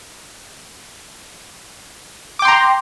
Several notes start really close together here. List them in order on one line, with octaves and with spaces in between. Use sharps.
D6 G5 C6 A#5